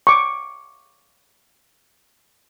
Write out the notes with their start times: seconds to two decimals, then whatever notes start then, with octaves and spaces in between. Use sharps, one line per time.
0.07 C#6 D6